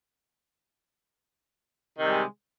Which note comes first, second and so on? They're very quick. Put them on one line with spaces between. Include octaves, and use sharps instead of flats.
D#3 C3 G3 G#3